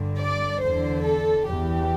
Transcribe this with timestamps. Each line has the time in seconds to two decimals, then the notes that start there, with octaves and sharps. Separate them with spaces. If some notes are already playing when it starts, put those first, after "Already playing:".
Already playing: G2 D3
0.18 D5
0.61 E2 D3 C5
1.04 A4
1.47 E2 E3 G4